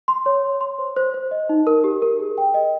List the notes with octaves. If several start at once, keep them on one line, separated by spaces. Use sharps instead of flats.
C6
C#5
C#5
C6
C5
C5
C5
D#5
D#4
A#4
G4
A#4
G#4
G5
D#5